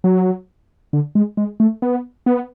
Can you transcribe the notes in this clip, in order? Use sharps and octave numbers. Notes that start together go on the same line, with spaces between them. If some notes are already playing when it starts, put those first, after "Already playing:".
F#3
D3
G#3
G#3
A3
B3
B3